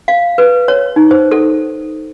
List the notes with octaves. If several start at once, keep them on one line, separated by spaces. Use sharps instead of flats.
F5
B4
C#5
D#4
C5
A4